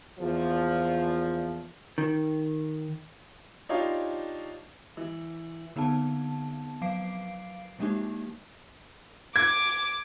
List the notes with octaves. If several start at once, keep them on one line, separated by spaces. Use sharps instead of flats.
E2 A#2 F3
D#3
D4 D#4 F4 G4 C#5 F5
E3
D3 B3 C4 D#4 A5
F3 F#3 F5 D6 C7 D7
F3 G#3 A#3 D4 D#4 G4
D6 G#6